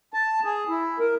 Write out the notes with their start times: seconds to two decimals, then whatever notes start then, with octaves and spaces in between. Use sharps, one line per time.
0.14 A5
0.44 G#4
0.69 E4
0.99 A#4